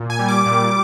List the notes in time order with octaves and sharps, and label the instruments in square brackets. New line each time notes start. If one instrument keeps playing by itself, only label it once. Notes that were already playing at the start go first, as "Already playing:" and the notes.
Already playing: [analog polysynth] A#2
G#5
G3
D6
A#2